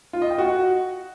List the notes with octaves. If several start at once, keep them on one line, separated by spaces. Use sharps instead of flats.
F4
D#5
G5
F#4